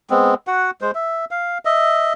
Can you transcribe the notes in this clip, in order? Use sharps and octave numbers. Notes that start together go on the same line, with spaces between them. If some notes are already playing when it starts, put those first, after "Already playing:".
G#3 B3 C4
F#4 F#5
G#3 C5
E5
F5
D#5 E5